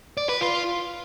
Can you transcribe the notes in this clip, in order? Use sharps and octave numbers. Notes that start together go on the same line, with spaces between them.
D5
B4
F4